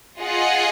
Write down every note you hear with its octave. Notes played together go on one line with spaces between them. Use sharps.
F4 G#4 D#5 F#5